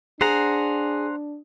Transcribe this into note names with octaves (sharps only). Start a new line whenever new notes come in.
D4 G#4 C5 F#5 A#5